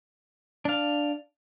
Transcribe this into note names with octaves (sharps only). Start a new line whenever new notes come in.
D4 F5